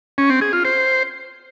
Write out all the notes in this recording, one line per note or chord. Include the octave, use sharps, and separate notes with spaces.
C#4
C4
G#4
F4
C5